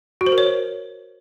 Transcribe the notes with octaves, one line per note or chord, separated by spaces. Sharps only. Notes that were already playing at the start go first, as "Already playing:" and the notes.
F#4
C5
A#4
C#5